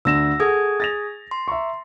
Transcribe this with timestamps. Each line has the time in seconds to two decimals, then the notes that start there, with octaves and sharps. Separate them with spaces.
0.05 D2 D3 E6 A#6 E7
0.40 G#4 A4 F#5 D#6 G#6
0.80 A6 A#6 F7
1.31 C6
1.48 E5 A#5 C#6